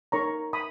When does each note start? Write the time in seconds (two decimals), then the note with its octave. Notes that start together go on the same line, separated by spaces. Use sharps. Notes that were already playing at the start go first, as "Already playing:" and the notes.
0.12 D#4 A#4 C#5 A#5 C#6
0.53 B5 D#6